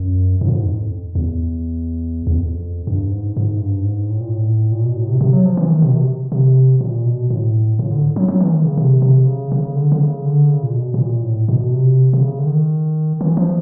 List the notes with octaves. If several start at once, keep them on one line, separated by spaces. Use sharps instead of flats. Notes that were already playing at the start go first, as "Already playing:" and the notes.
Already playing: F#2
G#2
A2
G#2
F2
E2
E2
F2
G2
G#2
G#2
G2
G#2
A2
A#2
A2
A#2
B2
A2
C3
C3
F#3
F3
E3
D#3
C3
B2
C3
C3
A#2
B2
A2
A2
D3
F#3
F#3
E3
D#3
C#3
C3
C3
C#3
C#3
D3
D3
C#3
D3
C#3
A#2
B2
B2
A#2
A2
B2
C3
C3
C#3
D3
D#3
E3
F3